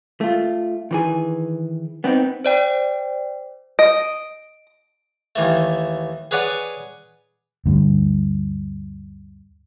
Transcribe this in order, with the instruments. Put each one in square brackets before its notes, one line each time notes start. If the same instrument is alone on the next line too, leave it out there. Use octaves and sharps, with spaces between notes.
[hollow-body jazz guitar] A3 F4
D#3 E3 G#4
B3 C4 D4 D#4
[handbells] C5 D5 G5
[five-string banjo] D#5 [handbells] D7
[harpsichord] D#2 E3 A3
G#4 B4 C#5 D5 F#5
[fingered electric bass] D2 G2